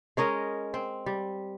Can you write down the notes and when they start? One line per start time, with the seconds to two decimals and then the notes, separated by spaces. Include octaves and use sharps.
0.17 G#3 C#4 A#4 D#5
0.74 C4
1.06 G3